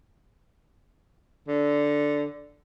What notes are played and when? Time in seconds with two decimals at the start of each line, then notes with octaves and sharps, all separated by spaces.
1.48 D3